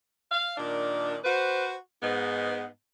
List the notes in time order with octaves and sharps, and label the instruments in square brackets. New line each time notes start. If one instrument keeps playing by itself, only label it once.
[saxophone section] F5
A#2 D#3 D4
F#4 B4 C5
G#2 B3